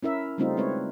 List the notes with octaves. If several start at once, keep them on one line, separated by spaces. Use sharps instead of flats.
C#4 E4 A#4 E5
C#3 G3 A3 C4 D#4 F4
G#3 C4 B4 C#5